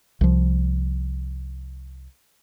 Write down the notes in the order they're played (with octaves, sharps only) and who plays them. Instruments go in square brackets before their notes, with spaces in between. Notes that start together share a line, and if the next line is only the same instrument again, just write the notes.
[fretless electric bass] C2 F3